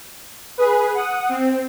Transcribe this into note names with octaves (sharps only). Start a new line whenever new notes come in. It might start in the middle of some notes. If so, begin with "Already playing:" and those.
G#4 B4
F#5 D#6
C4